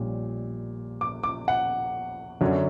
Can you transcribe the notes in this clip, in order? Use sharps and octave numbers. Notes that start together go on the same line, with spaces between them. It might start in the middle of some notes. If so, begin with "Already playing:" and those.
Already playing: A#1 A#2 G3 C#4
D6
D6
F#5
F#2 D3 F#3 C#4